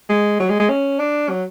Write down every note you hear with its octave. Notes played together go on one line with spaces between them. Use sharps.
G#3
F#3
G#3
G#3
C#4
D4
F#3